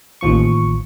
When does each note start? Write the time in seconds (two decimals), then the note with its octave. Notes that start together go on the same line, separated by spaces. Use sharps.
0.21 A1 D#2 F3 C#6